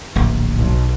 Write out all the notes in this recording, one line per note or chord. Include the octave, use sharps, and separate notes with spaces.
D1 A#1
B1